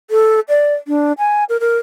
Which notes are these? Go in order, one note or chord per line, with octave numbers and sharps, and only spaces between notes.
A4
D5
D4
G#5
A#4
A#4